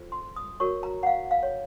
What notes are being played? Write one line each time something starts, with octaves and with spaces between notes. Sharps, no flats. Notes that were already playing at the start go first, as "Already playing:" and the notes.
Already playing: F4 A4 C5
C6
D#6
F#4 A#4 C#5 C#6
A#5
F#5
F5
F5
C#5